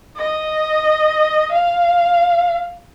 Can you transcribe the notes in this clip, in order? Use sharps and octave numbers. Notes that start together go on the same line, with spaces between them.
D#5
F5